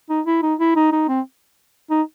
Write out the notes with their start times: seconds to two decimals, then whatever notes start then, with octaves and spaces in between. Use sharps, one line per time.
0.10 D#4
0.26 E4
0.43 D#4
0.60 E4
0.76 D#4
0.92 D#4
1.09 C4
1.90 D#4